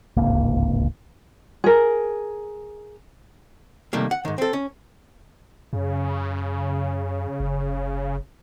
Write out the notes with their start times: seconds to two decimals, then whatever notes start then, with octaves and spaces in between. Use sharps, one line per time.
0.17 D1 G#1 C#2 A#3
1.64 G#4 A#4
3.93 C3 D#3 G3 A3 A#3
4.11 F#5
4.25 G#2 D#3
4.38 C4 A4
4.53 C#4
5.73 F#2 C#3
7.40 F#1